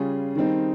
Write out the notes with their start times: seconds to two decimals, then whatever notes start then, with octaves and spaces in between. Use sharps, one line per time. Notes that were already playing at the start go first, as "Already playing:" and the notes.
Already playing: C#3 G3 C#4 F4 G#4
0.35 D#3 G3 C4 D#4